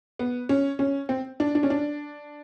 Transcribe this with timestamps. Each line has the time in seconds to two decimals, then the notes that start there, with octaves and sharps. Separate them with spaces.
0.19 B3
0.49 C#4
0.79 C#4
1.09 C4
1.40 D4
1.55 D4
1.63 C#4
1.70 D4